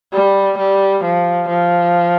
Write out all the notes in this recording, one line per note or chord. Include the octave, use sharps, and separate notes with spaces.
G3
G3
F3
F3